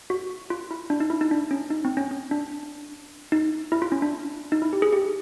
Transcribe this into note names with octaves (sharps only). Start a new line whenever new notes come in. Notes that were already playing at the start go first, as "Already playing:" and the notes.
F#4
F4
E4
D4
D#4
E4
D#4
D4
C#4
D#4
C4
C#4
C#4
D4
D#4
E4
F4
C#4
D4
D#4
E4
G4
G#4
G4